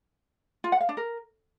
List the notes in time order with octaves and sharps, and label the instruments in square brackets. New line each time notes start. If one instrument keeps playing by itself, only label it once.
[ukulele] F4
F#5
F5
D4
A#4